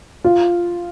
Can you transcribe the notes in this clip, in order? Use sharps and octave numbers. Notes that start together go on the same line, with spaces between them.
F4